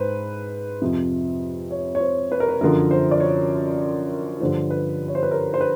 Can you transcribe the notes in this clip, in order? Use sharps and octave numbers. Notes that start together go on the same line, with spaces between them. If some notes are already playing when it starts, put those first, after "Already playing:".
Already playing: G#2 B4 C5
F2 C3 F3
C#5
C#5
C5
B4
A#4
B4
F#2 D3 F3 A#4
C5
D5
C#5
G2 D3 F3 C5
B4
C#5
C5
B4
A#4
C5
B4